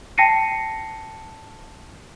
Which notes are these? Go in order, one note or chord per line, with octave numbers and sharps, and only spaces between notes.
G5 A5 A#6 C7 C#7 D#7